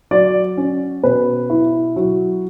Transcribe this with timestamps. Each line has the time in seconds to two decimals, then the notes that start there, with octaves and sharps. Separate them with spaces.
0.11 F#3 D5
0.57 C#4
1.04 B2 B4
1.50 E4
1.96 F#3